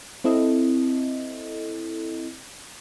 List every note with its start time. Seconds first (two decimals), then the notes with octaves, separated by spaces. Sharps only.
0.24 C4 E4 A4 D#5